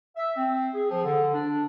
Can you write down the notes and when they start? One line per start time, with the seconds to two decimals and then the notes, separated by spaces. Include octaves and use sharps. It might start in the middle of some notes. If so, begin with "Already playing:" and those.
0.16 E5
0.37 C4
0.75 G#4
0.90 F3
1.04 D3
1.34 D4